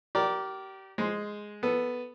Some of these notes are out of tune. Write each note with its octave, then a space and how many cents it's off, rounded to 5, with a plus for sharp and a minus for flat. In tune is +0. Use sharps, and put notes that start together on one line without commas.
G4 -30 A#4 +5 D5 -10
G#3 +0 G#4 +0 C5 +0
B3 +0 A4 +0